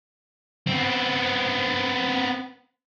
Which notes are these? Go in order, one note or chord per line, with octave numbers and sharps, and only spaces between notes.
B3 C4